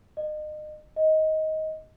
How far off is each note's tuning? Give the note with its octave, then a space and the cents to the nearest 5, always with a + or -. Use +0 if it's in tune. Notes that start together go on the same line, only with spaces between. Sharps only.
D#5 -35
D#5 +15